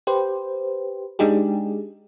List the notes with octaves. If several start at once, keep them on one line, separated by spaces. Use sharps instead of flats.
G4 B4 C5
G#3 D4 D#4 G4 G#4